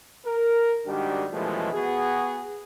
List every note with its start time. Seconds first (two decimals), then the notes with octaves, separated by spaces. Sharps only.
0.25 A#4
0.86 G#2 D#3 G3 D4 F#4 G4
1.31 F#2 B2 E3 F3 G#3 A3
1.73 B3 F#4 G#4